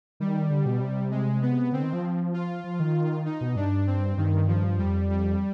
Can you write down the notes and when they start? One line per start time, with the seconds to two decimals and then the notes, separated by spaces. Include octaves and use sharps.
0.20 D#3 G3
0.50 D3
0.66 B2
0.81 C3
1.11 G#3
1.42 B3
1.72 D3 C4
1.83 D#3
1.93 F3
2.34 F4
2.64 F3
2.80 D#3
3.26 D#4
3.41 B2
3.56 G2 D4
3.87 C4
4.17 G2 D#3
4.48 F3
4.78 F2 G3
5.10 G3